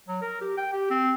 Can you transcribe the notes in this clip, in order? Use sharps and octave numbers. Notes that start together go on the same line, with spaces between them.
F#3
A#4
G4
G5
G4
C4